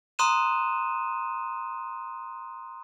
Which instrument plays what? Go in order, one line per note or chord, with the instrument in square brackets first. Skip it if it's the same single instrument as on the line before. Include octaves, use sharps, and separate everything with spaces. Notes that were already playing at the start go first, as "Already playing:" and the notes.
[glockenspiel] A#5 C6 D#6 F#6 D#7 E7